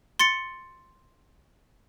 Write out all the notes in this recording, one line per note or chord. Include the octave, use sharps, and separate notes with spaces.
C6 A6 C#7